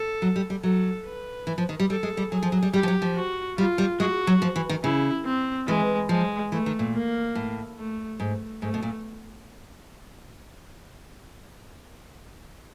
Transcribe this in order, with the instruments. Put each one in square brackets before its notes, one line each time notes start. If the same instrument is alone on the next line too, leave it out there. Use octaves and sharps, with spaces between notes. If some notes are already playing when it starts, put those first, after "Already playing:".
Already playing: [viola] A4
[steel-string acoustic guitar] F#3
G3
G3
[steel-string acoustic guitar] F#3 [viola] A4
[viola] B4
[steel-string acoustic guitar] E3
F3
D#3
G3
[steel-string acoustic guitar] G3 [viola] A4
[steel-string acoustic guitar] G#3
G3
[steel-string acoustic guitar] F#3 [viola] G#4
[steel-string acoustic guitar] F3
F#3
G3
[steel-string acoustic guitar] G3 [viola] G4
[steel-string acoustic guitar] F3
F#3
F3
[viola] F#4
[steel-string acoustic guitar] G3 [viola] F4
[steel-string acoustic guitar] G3
[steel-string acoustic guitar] G#3 [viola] F#4
[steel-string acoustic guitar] F#3
F3
E3
D#3
[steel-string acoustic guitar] C#3 [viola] E4
[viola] C4
[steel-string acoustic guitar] E3 [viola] G#3
[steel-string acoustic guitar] F3 [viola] G#3
[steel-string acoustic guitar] E3 [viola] A3
[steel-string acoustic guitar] D#3
A#2
[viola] A#3
[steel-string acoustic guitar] A2
[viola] A3
[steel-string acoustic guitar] G#2 [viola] A3
[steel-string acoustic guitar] G#2 [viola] A3
[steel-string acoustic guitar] B2
A#2